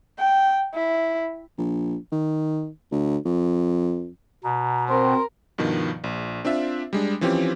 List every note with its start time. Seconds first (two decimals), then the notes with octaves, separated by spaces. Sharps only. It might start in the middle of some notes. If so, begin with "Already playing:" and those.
0.19 G5
0.74 E4
1.58 A#1
2.12 D#3
2.91 D2
3.25 F2
4.44 B2 A#5
4.89 C4 A#4 C6
5.58 G2 B2 D#3 F3
6.04 A#1
6.45 C4 D4 F4 E5
6.93 G3 G#3 D4
7.21 E3 F3 C4 C#4 G4